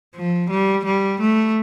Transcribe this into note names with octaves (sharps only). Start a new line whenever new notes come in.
F3
G3
G3
A3